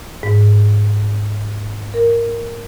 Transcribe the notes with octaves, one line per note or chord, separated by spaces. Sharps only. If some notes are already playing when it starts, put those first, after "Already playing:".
G#2
A#4